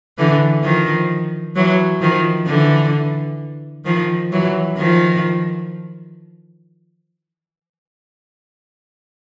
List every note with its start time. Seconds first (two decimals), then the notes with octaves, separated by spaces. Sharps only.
0.18 D3 E3
0.63 D#3 F3
1.56 E3 F#3
2.01 D#3 F3
2.47 D3 E3
3.85 D#3 F3
4.32 E3 F#3
4.77 D#3 F3